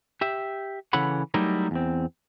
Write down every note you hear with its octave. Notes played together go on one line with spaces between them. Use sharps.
G4 E5
C#3 E3 A4 C#5 F#5 B5
F#3 G3 A3 D#4 E4 A#4
E2 C4